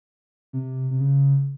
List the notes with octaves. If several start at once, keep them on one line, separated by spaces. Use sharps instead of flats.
C3
C3
C#3